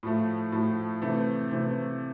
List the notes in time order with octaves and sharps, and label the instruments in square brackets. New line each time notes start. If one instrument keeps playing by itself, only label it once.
[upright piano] A2 F3 A3
A2 F3 A3
C3 E3 A3
C3 E3 A3